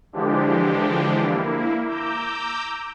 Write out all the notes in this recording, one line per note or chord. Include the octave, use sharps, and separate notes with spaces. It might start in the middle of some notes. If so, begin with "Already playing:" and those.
D3 E3 F3 G#3 D4 G4
A#3 E4
A#5 D6 E6 G6